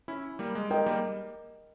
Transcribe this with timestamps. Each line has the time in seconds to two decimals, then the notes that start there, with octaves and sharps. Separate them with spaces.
0.08 C#4 E4
0.39 G3 A#3
0.55 G#3
0.70 G#3 A#4 D#5 G5
0.86 G3 A#3